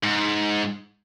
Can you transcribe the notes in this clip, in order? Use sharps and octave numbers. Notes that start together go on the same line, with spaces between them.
G#2